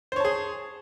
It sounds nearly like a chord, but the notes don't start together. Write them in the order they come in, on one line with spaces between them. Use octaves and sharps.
C5 C#5 A5 G#4